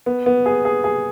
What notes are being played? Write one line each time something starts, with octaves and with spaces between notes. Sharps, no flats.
B3
B3
G#4
G#4
G#4